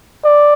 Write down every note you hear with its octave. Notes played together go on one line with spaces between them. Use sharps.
D5